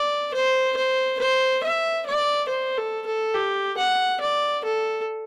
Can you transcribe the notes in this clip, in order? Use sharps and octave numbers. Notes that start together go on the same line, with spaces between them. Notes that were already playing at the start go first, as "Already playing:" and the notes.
Already playing: D5
C5
C5
C5
E5
D5
C5
A4
A4
G4
F#5
D5
A4